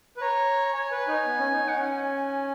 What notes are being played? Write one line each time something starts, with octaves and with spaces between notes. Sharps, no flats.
B4
C#5 A#5
A#5
C#5 G#5
B4
D#4
B3
C#4
D#4
D#4 F#5
C#4 G#5